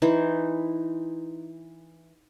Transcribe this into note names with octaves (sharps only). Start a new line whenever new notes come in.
E3 D#4 C5